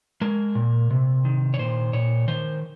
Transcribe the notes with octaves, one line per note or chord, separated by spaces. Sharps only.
G#3 A#4
A#2
C3
D#3
C#5
A#2 C5
A#2 C#5
D#3 C5